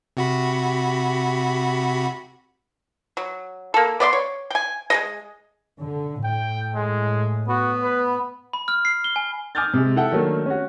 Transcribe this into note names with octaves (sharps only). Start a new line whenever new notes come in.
C3 F#4 B5
F#3
A#3 A4
B3 D5 D#5 C6
C#5
G5 G#5
G#3 A4 D#5
D3
A2 G5
G#3
B3 F#4
B4
B5
F6
C7
G7
G#5
G#5 D6 D#6 F6 G6 A6
C3 G#3
E4 A4 F#5 G5
D#3 F#3 A3 A#3 D4
C#4 F#4